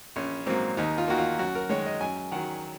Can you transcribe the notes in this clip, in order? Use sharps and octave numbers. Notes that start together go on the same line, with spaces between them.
A#1 C#4
G#2 F#3 A#3 C4
D#2 D#4
F4
D#3 A#3 F#4
F4
F#2 F#4
A#4
D#3 G#3 C#5
D#5
F#2 G#5
D#3 F#3 F#5